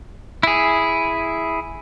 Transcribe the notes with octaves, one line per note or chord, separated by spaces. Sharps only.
E4 G#4